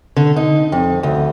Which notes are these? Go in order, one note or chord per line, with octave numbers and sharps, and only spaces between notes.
D3
D#4
F2
D2